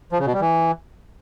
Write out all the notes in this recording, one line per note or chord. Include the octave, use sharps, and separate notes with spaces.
F3
C#3
B2
G3
E3